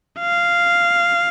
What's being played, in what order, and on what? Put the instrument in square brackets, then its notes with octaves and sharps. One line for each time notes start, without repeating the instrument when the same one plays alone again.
[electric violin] F5